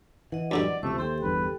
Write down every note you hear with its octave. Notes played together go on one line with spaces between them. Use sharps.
E3 D#5 F#5
F#2 D3 G3 D5
C#2 C3 F3 A3 C5 E5
D#2 G4 A4 C5 G5
G1 E2 G2 B4